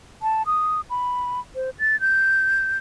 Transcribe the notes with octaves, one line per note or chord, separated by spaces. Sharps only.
A5
D#6
B5
C5
A6
G6